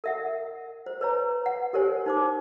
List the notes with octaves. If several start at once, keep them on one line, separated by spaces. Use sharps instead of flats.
A#4 E5 F#5
C5
B4 C#5 A#5
F#5
G4 A#4 C5 C#5 G#5
D#4 C5 D6